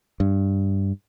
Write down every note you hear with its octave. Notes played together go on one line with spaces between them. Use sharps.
G2